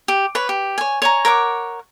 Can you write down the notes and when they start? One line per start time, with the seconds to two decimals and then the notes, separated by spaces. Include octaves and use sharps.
0.08 G4
0.35 B4 C#5
0.49 G4
0.78 C#5 G#5
1.02 C#5 G#5 A#5
1.25 A#4 C#5 F#5 D6